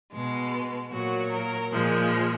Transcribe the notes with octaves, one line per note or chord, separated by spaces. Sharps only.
B2 G#3
A#2 F#3 F#4
A#4
A#2 F3 G#3